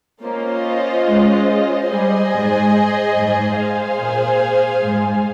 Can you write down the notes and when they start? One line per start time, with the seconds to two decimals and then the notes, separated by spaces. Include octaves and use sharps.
0.21 A#3 C#4 F4 C5 D#5
1.05 G#3
1.90 G3 G#4 C5 D#5 G#5
2.32 G#2
3.16 G#2
3.58 G#4 C5 F5 G#5
3.99 A#2
4.83 G#2